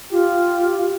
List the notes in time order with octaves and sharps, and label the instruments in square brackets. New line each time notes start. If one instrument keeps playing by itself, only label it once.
[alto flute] F4 [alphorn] G4